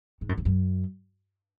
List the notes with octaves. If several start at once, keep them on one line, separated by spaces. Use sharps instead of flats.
G#2
F#2
E2
F#2